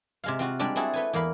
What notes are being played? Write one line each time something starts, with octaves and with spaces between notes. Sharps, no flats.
C3 G#3 F5
C4 F4 F#4
G3 G#3 D4 D5
C4 E4 F#4 G#4 A4
A3 B4 G#5
E2 A#3 F5 B5